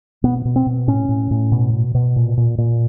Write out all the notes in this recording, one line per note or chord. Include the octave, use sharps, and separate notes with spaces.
B2 B3
B2
C4
B2
A2 C#4
A2
A2
B2
B2
B2
A#2
A#2
A#2